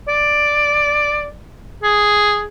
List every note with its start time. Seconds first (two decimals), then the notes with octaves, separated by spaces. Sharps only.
0.08 D5
1.83 G#4